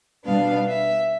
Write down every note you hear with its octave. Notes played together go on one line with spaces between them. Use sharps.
B2 G3 B3 D4 F5
E5